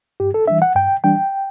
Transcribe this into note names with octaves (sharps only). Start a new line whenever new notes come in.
G2 G4
A4
E3 G3 D4 E5
F#5
G2 G5
E3 G3 D4 G5